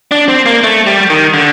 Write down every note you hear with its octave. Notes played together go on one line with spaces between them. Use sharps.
D4
C4
A#3
A3
G3
D#3
D3